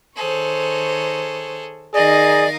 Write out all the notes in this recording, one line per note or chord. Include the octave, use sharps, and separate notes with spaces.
D#3 G#4 A4 C5 C#5
D#3 D#4 G#4 A#4 D5 D#5 F5